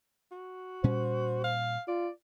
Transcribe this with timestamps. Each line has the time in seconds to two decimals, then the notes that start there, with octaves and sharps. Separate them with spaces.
0.32 F#4
0.84 A#2 G3 C#4 C5
1.44 F5
1.88 F4 D5